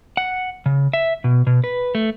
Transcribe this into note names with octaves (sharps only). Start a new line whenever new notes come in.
F#5
C#3
E5
B2
B2
B4
A3